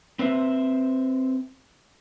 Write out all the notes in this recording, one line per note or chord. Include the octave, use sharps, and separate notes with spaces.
C4 B4 C5 E5